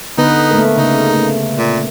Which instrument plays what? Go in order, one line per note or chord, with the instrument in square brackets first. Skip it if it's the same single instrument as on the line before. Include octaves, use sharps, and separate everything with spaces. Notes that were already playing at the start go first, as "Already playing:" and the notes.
[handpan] D3 B3 B4 [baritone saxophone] D#4
[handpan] A3 A#3 A#4
[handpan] C#3 [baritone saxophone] D#4
[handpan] A3
[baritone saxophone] A#2